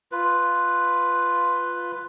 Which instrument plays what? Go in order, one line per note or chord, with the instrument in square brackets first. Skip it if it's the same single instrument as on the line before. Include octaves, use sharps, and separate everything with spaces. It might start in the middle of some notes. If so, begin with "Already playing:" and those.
[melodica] F4 B4